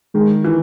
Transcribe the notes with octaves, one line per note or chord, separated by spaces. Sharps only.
D#3 G#3
E3